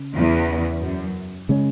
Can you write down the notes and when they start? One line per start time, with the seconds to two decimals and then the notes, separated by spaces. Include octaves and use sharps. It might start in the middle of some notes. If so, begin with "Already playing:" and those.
Already playing: C#3
0.16 E2
0.81 F#2
1.49 C#3 G#3 C#4